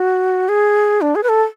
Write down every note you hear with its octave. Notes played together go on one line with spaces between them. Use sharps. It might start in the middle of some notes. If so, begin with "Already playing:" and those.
Already playing: F#4
G#4
D4
G#4
B4
A4